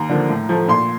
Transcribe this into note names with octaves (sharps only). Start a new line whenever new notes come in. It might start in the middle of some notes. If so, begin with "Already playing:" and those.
Already playing: D#2 A#5
D3 F3 A#3
A2
F3 A3
A#2 C6